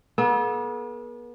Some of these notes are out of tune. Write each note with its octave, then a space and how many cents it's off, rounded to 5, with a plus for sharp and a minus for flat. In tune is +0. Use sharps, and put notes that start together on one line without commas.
B3 -40 A4 -45